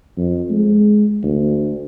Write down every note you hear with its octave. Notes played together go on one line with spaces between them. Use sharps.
F2
G#3
D2